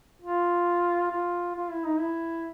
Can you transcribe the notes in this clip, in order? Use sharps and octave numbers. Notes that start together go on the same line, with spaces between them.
F4
F4
F4
E4
D#4
E4